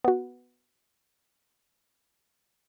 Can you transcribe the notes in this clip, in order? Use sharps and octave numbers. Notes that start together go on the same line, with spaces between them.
B3 F#4